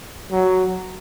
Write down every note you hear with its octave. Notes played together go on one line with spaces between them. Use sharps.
F#3